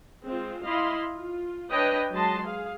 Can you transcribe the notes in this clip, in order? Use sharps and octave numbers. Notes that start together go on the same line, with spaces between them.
G#3 C4 F4
E4 D#5 F5 B5 C6
F4
D4 B4 C#5 D#5 G5
F#3 G#3 D#5 A5 C6
G#4 F5